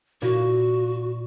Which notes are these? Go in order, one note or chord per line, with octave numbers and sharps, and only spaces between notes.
A#2 E4 F#4